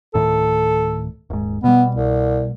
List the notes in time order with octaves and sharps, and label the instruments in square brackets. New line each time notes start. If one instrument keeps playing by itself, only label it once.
[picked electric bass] D1 A2 D#3 [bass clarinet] A4
[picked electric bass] D#1 G#2
[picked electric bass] B2 G3 [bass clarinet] B3
[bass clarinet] C2